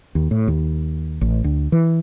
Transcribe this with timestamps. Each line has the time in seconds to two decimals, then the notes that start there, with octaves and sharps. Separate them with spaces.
0.15 D#2
0.31 A2
0.48 D#2
1.21 A1
1.44 D2
1.72 E3